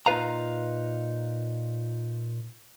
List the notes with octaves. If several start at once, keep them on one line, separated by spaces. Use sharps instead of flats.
A#2 D#4 F4 B4 F5 A#5